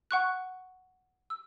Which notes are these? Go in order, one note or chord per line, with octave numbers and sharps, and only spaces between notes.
F#5 C#6 F#6
E6